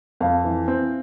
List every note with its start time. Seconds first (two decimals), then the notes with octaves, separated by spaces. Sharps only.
0.21 F2 F5
0.44 E3
0.68 C4